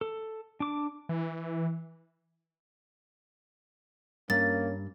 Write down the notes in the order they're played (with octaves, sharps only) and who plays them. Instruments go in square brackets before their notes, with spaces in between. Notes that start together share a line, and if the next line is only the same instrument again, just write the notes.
[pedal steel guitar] A4
D4 D6
[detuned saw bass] E3
[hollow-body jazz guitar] G2 [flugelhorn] A#3 [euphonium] C#4 [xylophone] A6